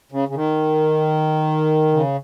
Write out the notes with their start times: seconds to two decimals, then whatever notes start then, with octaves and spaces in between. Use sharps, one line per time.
0.12 C#3
0.29 C#3
0.35 D#3
1.93 C#3